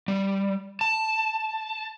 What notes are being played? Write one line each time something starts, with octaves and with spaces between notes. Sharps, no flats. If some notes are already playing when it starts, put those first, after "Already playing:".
G3
A5